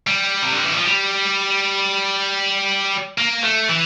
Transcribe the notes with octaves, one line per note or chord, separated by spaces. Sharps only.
G3
C3
D3
E3
F3
G3
A#3
A3
E3